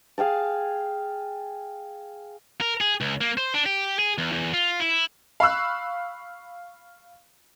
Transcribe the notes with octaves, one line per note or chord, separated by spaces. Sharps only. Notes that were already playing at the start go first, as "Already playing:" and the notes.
G#4 F5 G5 A5
A#4
G#4
C#2
A#3
C5
D4
G4
G#4
E2
E2
F4
E4
F5 B5 C#6 E6 F#6